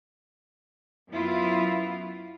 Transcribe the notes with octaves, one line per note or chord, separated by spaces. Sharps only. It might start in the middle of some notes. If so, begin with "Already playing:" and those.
F#2 B3 E4 F4